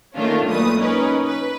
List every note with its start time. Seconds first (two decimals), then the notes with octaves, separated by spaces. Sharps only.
0.15 D#3 A3 A#3 C#4 D4 F4
0.46 B1 A#2 G#3 A3 B4 D#6
0.78 C#4 D#4 A#4 B4
1.24 B4